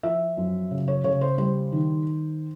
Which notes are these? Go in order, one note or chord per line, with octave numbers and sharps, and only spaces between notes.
F3 E5
F#2
C#3
C#5
C#3 C#5
C5
G3 C5
D#3